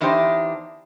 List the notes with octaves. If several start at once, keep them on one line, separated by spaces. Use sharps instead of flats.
E2 E3 D4 D#4 G4 C5